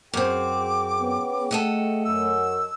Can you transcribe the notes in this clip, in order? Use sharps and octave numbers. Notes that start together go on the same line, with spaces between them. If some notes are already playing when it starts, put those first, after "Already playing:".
F#2 C4 G#4 G5 D6
B3 C#4
A3 A4 D#5 F#5
F#2 E6